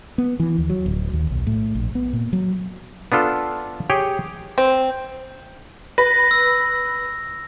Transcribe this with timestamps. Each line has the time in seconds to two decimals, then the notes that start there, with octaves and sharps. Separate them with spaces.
0.18 B3
0.40 E3
0.58 D#2
0.70 F#3
0.86 D1
1.13 D#2
1.31 B1
1.47 A2
1.75 A#1
1.95 B3
2.13 A#2
2.33 F#3
3.12 B3 D4 F4 A4
3.90 G4 G#4 C#5 G5
4.58 C4
5.98 B4 A#6
6.31 E6